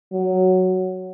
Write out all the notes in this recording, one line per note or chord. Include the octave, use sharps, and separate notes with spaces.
F#3